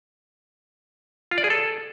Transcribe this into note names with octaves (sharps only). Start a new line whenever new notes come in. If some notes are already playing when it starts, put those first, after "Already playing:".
F4
D5
G#4
A4